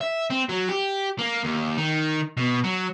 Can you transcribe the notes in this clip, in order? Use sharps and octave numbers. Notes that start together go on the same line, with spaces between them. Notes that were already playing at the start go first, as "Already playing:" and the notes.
E5
C4
F#3
G4
A#3
D#2
D#3
B2
F#3